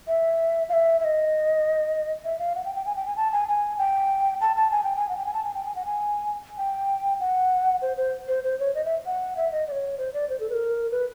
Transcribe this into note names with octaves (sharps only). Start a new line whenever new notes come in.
E5
F5
E5
E5
D#5
E5
F5
F#5
G5
G5
G#5
G5
G#5
A5
G#5
G#5
G5
A5
A5
G#5
G5
G#5
F#5
G5
G#5
A5
G#5
G5
G#5
F#5
G#5
G5
F#5
C5
C5
C5
C5
C#5
D#5
E5
F#5
E5
D#5
D5
C#5
C5
D5
C5
A4
B4
A#4
B4